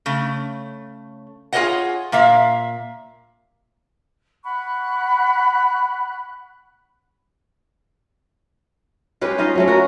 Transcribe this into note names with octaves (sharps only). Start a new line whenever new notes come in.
C#3 A3
F4 G#4 A#4 C#5 D#5 F#5
A#2 A#3 E5 F5
F#5 B5 C#6 F#6
G#3 C#4 G4 B4
D#4 F4 D#5 F5
F#3 A3 C#4
F#4 A#4